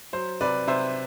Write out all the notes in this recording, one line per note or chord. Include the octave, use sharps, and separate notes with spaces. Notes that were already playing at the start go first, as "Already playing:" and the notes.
F#3 C5
C3 B4 D5
C3 C5 E5